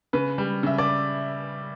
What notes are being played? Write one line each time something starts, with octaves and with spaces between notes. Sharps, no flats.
C#3 B4
G3
C#3 E5
D5